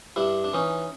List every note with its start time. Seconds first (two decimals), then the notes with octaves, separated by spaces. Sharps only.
0.16 G2 D4 E4
0.44 D4
0.53 E3 C#4 D#4